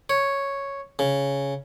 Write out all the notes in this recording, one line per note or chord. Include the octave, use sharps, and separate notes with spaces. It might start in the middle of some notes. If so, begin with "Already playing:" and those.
C#5
C#3